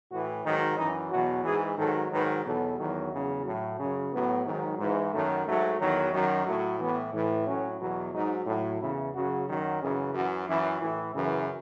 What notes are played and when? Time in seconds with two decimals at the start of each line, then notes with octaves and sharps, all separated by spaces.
0.11 A2 E3 F#4
0.44 G#2 D#3 F#3 D#4
0.77 F#2 E3 D#4
1.11 E2 B2 F#3 F#4
1.44 G#2 E3 G#4
1.77 G#2 D#3 F#3 A4
2.11 G#2 D#3 F#3 B4
2.44 E2 B2 F#3 A4
2.78 E2 D#3 F#3
3.11 E2 C#3 F#3
3.45 A2 F#3
3.78 F#2 C#3 F#3 C#4
4.12 A2 F#3 B3
4.46 G#2 D#3 F#3
4.79 G#2 E3
5.13 F#2 D#3 F#3 A3
5.46 G#2 F#3 A3
5.80 E2 D#3 F#3
6.13 F#2 D#3 F#3
6.46 A2 F#3 A3
6.79 A2 E3 B3
7.13 A2 E3
7.46 A2 F#3 C#4
7.80 E2 B2 F#3
8.13 G#2 F#3 D#4
8.47 A2 F#3
8.81 E2 C#3 E3 E4
9.14 F#2 C#3 F#3 F#4
9.48 F#2 D#3 F#3
9.81 F#2 C#3 E3 G#4
10.15 F#2 E3 F#4
10.48 F#2 E3 E4
10.81 A2 E3 E4
11.14 F#2 C#3 E3